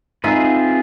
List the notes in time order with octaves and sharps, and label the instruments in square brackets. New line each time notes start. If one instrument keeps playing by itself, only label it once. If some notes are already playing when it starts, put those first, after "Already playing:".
[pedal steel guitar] C4 F4 G#4 B4 E5 [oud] D#4